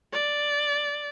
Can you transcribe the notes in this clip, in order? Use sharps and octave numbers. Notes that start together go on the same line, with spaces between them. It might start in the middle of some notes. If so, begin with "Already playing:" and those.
D5